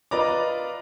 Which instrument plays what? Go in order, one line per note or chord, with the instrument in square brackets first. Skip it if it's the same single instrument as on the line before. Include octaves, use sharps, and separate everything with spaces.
[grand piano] F4 B4 D5 D#5 A#5 D6